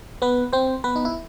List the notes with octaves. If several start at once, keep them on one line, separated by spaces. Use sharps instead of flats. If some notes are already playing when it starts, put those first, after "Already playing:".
B3 B4
C4 C5
B3 B4
D#4
E4